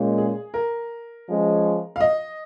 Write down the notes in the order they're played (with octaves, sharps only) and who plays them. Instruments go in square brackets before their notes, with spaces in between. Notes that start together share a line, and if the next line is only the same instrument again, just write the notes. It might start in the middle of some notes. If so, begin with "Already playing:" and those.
Already playing: [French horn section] A#2 G#3 C#4
[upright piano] G#4
A#4
[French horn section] F3 G#3 C#4 G#4
[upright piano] F5
D#5